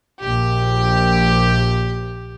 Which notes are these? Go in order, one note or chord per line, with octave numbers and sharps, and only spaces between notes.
A#1 G4